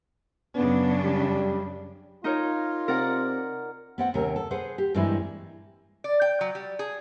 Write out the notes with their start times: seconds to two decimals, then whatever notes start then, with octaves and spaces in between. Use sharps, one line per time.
0.55 F#2 C#3 B3 D4
1.01 G3
2.24 D#4 F4 A#4 C#5
2.88 C3 A#4 D5 F#5
3.98 B3 C4 F#5
4.14 D#2 C3 C#4 A#4
4.36 A4
4.51 G#4 B4 C5 F#5
4.78 G4
4.94 G2 A#2 E3 G#3 C4 E4
6.04 D5
6.22 G5
6.41 F#3
6.55 G3
6.79 G#4